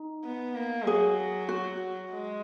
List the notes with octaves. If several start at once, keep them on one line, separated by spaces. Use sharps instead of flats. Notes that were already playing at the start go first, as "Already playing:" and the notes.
Already playing: D#4
B3
A#3
F#3 G#4
F#4
G#3